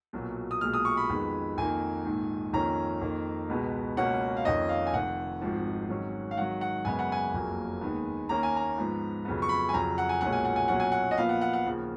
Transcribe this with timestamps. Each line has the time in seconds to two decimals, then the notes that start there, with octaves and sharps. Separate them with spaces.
0.13 B1 A#2 F#3
0.51 D#6
0.61 B1 A#2 G#3 F6
0.74 D#6
0.85 C#6
0.97 B5
1.09 F2 D#3 G#3 B3
1.57 F2 D#3 A#3 G#5
2.05 A#1 G#2 D#3
2.53 F2 D#3 A#3 C#4 A#5
3.01 F2 D#3 A#3
3.49 C#2 B2 G#3 B3
3.97 C#2 B2 A#3 C#4 F#5
4.37 F5
4.45 F2 D#3 A#3 C#4 D#5
4.69 F5
4.87 G#5
4.93 F1 F2 D#3 F#5
5.41 G#1 G#2 F3
5.89 G#2 D#3 F#3 C#4
6.31 F5
6.37 G#2 D#3 F#3 F#5
6.61 F#5
6.85 F#2 C#3 G#3 B3 G#5
6.99 F#5
7.12 G#5
7.34 F#1 F2 C#3 F#3 A#3
7.81 D#2 D#3 G#3 B3
8.29 D#2 D#3 A#3 C#4 A#5
8.43 G#5
8.56 A#5
8.78 G#2 F3 B3
9.25 F2 C#3 F#3 B3
9.42 C#6
9.49 B5
9.69 G#5
9.73 F2 C#3 F#3 A#5
9.98 F#5
10.09 G#5
10.21 B1 A#2 G#3 C#4 F#5
10.32 G#5
10.45 F#5
10.56 G#5
10.68 B1 A#2 F#3 C#4 F#5
10.80 G#5
10.92 F#5
11.11 D#5
11.17 A#1 A#2 F3 B3 F5
11.29 F#5
11.41 F#5
11.53 F#5
11.66 D#2 C#3 F3